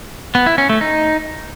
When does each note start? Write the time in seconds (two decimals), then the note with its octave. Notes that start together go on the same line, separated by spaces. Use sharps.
0.35 B3
0.46 E4
0.58 C#4
0.69 A3
0.81 D#4